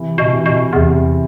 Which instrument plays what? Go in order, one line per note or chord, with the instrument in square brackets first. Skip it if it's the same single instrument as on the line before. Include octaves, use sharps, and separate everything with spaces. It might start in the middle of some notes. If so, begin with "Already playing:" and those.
Already playing: [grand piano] C3 E3
[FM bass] B2
[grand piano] C3 E3
[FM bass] B2
[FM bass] E2 [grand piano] C3 E3